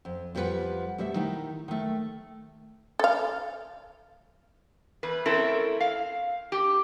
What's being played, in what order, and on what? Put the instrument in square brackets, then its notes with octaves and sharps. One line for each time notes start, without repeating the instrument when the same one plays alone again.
[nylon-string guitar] F2
F2 F3 G3 D#4 B4 F#5
B2 G3 A3 E5
D#3 D#4 E4
D#3 A3
[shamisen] A4 F5
[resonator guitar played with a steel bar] E2 B4
A3 C4 C#4 E4 A4 A#4
F5
G4